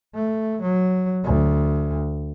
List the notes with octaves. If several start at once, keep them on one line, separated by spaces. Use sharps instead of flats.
A3
F#3
D2